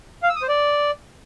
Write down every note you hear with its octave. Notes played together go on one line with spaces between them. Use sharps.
F5
E6
D#6
C5
D5